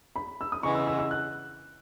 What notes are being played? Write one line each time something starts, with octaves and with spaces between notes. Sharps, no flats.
B5
E6
D#6
C#3 E3 G#3 B3 C#6
E6
E6
E6
F#6